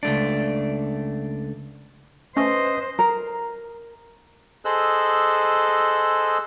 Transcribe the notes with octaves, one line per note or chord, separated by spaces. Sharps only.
C#2 A3 D4
A3 C#4 B4 C5 D#5
A#4
G#4 A4 C5 D#5 E6 F#6